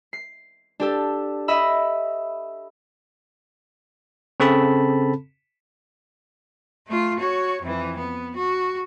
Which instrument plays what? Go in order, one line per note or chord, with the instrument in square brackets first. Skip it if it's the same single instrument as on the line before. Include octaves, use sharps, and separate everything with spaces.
[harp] C7
D4 G4 A4
D#5 E5 B5 E6
[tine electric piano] C#3 C4 A4 A5 B5
[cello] A3 F4
F#4 C#5
F2 E3
B3
F#4